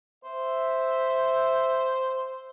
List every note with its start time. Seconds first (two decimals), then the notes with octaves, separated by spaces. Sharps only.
0.24 C5 E5